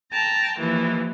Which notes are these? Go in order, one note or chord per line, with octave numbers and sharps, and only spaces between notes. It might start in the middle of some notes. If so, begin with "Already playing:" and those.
G5 A5 A#5
D#2 E3 F3